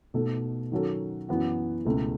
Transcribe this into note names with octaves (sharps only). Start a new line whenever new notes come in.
B2 A3 D#4 A4
D#3 F#3 C#4 F#4 A4
F#2 E3 B3 F#4
C#2 B2 A3 E4 G#4